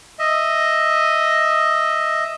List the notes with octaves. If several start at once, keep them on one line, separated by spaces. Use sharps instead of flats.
D#5 E5